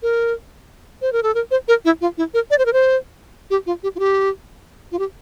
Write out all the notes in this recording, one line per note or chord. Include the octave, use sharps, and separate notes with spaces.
A#4
C5
A#4
A4
A#4
C5
A#4
E4
F4
E4
A#4
D5
C5
A#4
C5
G4
F4
G4
F4
G4
F4
G4